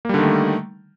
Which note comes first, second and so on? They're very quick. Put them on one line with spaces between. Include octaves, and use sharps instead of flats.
A#3 G3 D3 D#3 A3